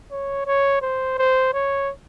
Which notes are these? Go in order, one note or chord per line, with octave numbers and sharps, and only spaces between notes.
C#5
C#5
C5
C5
C#5